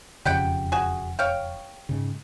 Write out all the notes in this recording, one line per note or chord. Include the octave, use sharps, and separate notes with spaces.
E1 F2 C#3 G4 F#5 G5
F#4 G#4
C#5 F5 G5
G#2 C#3